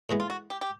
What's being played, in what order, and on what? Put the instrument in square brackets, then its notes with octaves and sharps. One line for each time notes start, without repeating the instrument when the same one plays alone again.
[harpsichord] A2 E3 G#3 B3
[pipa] F4
F#4
G4
G4